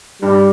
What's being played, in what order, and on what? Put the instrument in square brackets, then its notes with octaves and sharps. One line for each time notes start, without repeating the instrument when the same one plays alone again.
[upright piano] G2 [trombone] G3